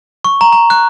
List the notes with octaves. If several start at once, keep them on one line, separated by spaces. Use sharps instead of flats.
C#6
A#5
A#5
F#6